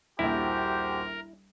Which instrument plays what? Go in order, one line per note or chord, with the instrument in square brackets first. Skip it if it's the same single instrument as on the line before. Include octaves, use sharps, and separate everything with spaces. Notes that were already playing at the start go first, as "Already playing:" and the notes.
[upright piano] D#1 A#1 [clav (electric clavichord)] E4 [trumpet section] F#4 G4 C5 [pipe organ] A#4